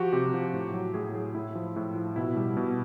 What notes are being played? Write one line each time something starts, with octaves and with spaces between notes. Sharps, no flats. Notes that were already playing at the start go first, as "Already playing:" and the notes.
Already playing: F3 F#4 G4
C3 G4
F3
A2
F#3
A2 G#4
F#3 G#4
A2 E4
F3
A2
F3
B2 E4
G3
B2